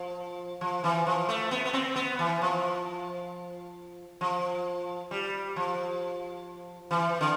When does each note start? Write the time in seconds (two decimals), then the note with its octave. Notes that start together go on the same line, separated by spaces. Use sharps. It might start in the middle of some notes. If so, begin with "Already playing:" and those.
Already playing: F3
0.61 F3
0.84 E3
1.06 F3
1.29 A3
1.51 B3
1.65 B3
1.73 C4
1.96 B3
2.19 E3
2.42 F3
4.21 F3
5.11 G3
5.56 F3
6.91 E3
7.21 D3